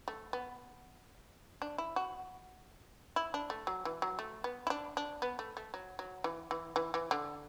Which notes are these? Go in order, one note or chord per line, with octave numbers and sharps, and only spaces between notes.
A3
B3
D4
E4
F#4
E4
D4
A3
F#3
E3
F#3
A3
B3
E4
D4
D4
B3
A3
A3
F#3
F#3
E3
E3
E3
E3
D3